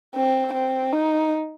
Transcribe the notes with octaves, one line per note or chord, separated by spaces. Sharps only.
C4
C4
D#4